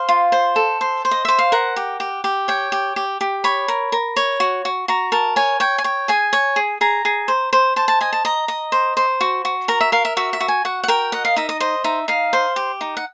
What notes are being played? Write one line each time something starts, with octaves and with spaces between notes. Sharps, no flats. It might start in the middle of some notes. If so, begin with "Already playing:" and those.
Already playing: C5 F5
F4
C5
A4
C5
C5
D#5
C5 E5
F5
A#4 F#5
G4
G4
G4
C#5 G5
G4
G4
G4
C#5 B5
A#4
A#4
C#5
F#4
F#4
F#4 A#5
A#4 A5
C#5 G#5
C#5 G5
G#5
C#5 G5
G#4 G#5
C#5
G#4
G#4 A#5
G#4
C5
C5
C5 A5
A5
D#5 G#5
A5
D#5 A#5
D#5
C5
C5
F#4
F#4
A#4 A#5
E5
A#4 F5
E5
F#4 E5
E5
F#4
G#5
F#4 F#5
F#5
A#4 G5
D#5 F#5
F5
D#4 E5
D#5
C5 D#5
D#4 E5
D#4 F5
C5
G4
D#4
F#5